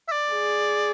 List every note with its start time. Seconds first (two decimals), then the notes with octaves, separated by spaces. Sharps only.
0.08 E5
0.12 D5
0.32 G#4